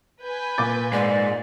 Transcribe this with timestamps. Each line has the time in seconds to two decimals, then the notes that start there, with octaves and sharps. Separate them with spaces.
0.23 B4 G#5 G6
0.58 A#2 D6 A6
0.93 G#2 D5